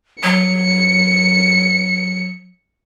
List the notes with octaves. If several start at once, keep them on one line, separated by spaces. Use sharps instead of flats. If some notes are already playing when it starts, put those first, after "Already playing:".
F#3 C#7